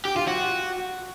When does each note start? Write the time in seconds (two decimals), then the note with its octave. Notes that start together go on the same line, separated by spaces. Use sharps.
0.05 G4
0.16 F4
0.28 F#4